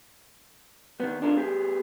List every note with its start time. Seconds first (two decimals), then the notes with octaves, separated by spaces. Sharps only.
1.00 D#3 B3
1.22 D4 D#4 F4 A4 A#4
1.37 B3 G4 G#4